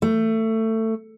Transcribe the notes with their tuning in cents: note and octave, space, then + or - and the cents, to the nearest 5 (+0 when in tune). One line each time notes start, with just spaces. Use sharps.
A3 +20